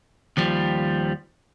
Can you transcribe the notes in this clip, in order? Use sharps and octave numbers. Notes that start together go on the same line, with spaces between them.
D#2 F3 G3